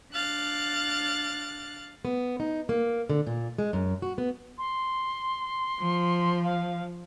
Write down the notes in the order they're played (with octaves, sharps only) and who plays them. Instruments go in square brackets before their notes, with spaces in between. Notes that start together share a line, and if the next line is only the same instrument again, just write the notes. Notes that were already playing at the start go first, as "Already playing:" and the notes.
[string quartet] D4 F5 F#6 A6
[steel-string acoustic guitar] B3
D#4
A#3
D3
A#2
G#3
F#2
F#4
B3
[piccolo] C6
[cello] F3
[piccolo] F5